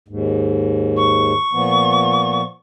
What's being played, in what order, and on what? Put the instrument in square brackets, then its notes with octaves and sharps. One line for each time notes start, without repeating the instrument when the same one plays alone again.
[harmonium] D#2 G#2
[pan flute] C#6
[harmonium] A#2 F3 B3